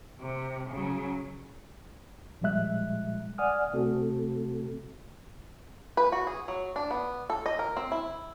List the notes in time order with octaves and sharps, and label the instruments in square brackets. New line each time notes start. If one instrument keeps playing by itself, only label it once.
[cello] C3
C#3 F#3
[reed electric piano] A#2 F3 G3 G#3 E5 F#6
D5 F#5 G#5 D#6 F6
C3 A3 C4 F#4 A4
[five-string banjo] B4
F#4
G#4
F#3
D4
B3
A4
D#5
A#4
C4
E4